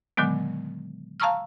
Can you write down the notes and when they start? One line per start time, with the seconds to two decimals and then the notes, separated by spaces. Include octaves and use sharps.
0.17 A#2 D3 D#3 F#3 G#3 B3
1.20 F5 A5 A#5 C#6 E6 F6